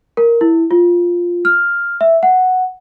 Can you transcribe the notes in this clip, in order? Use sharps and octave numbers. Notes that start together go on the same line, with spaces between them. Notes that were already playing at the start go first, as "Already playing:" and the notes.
A#4
E4
F4
F6
E5
F#5